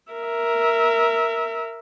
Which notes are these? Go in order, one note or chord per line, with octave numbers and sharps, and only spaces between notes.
A#4 E5